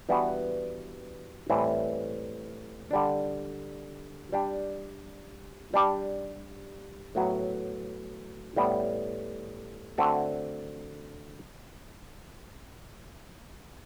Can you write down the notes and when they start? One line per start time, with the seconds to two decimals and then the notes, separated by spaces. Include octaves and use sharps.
0.09 E3 G3 B3 D4 F#4
1.50 A2 E3 G3 C4
2.91 D3 G3 D4
4.32 G3 D4 G4
5.74 G3 D4 G4
7.15 A2 F#3 B3 F#4
8.56 A2 G3 B3
9.98 D3 A3 C4 F#4 A4